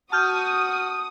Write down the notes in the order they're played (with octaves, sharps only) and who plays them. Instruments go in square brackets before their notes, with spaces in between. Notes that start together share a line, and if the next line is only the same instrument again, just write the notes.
[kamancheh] F#4 [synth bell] A5 F6 G6 [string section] D#6